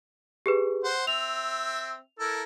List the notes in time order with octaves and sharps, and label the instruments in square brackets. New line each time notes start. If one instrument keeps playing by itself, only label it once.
[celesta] G4 G#4 B4
[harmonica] C5 F#5
[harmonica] C4 E5 [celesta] F7
[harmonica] E4 A4 A#4